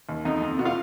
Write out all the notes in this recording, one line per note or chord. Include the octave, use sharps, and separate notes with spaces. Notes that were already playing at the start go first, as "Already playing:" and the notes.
D#2
F2 D#4
F2
B2 F#4
F4